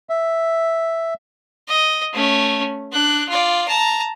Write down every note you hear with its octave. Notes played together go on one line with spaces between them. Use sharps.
E5
D#5
A3 C#4
D4 F#6
F4 D5
A5 A#5